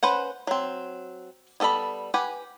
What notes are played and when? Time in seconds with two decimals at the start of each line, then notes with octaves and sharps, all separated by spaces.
0.03 C#4 B4 C5 F#5
0.47 F#3 C4
1.60 G3 B3 A4 D5 B5
2.14 G4 B4 F#5 G#5